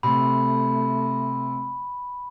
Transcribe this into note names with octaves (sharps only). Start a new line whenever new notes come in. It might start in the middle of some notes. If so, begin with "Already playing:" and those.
C3 A3 B5